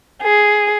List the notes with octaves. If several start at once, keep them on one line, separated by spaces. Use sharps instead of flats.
G#4